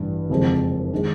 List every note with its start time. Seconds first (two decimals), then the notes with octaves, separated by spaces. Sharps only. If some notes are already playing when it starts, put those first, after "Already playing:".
Already playing: A1 G2 E3
0.30 F#1 F2 C3 F3 G#3
0.93 D#3 G#3